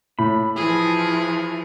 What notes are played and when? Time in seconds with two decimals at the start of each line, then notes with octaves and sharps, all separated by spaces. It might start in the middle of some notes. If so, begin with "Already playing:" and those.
0.19 A2 B5
0.56 E3 F3 G#4